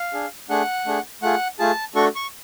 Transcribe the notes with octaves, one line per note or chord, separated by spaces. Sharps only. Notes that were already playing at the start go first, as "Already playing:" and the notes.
Already playing: F5
D4 G#4
A3 D4 G#4 F#5
A3 D4 G#4
A3 F4 G#4 F#5
A3 F4 G#4 A5
A3 D4 F#4 A4 C#6
C#6